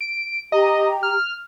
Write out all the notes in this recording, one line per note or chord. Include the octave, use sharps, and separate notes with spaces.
D7
G4 D#5 A#5
F6